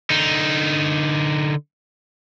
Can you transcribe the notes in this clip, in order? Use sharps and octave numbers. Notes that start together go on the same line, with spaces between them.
D3 D#4